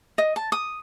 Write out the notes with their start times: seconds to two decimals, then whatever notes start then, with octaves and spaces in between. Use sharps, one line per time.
0.18 D#5
0.36 A5
0.52 D#6